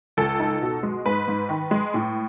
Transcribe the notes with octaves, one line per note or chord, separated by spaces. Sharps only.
C#2 A4
D#4
B2
G#3
G#2 B4
G#2
D#3
G#3
A2